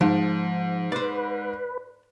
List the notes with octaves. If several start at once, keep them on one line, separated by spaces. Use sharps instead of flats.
G#2 F3
B4 C5 D5